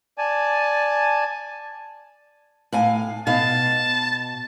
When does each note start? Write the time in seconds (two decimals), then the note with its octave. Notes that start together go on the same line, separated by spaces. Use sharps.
0.18 D5 G#5 A5
2.72 A2 F5 G#5
3.27 B2 F5 A5